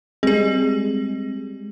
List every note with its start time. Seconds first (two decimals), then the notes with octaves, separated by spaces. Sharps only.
0.23 G3 G#3 C4 G#4